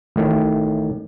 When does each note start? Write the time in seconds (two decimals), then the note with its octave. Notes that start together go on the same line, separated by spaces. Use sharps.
0.16 A1 A2 D#3